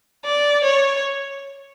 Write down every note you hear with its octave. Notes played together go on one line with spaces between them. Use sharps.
D5
C#5